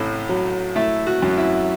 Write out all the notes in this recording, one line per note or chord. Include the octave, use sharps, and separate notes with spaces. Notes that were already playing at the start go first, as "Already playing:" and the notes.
Already playing: A1 A2
F#3
A3 E4
F#4
F#2
E4